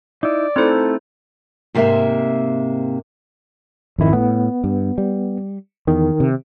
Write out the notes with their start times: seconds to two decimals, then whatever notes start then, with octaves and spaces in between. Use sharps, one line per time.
0.23 D#4 E4 D5
0.56 A3 C4 D#4 E4 A4 C5
1.75 G#2 C3 A#3 C5 E5
3.99 G#1 F2 D#3 E4
4.13 A2 B3
4.64 G2
4.98 G3
5.87 E2 D#3
6.20 C3